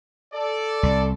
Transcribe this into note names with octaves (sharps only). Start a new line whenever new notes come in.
A4 D5
C2